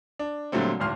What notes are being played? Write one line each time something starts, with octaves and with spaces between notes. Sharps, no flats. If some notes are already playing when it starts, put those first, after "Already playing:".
D4
A#2 D3 F#3 G3 A3 C4
D1 G#1 C6 F6